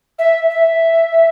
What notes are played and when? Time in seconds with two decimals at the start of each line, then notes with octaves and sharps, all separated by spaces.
0.19 E5
0.50 E5